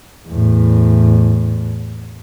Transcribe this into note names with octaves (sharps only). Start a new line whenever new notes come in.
E2 A2